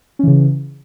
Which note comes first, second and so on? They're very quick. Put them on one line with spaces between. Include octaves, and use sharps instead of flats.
C#4 E3 C#3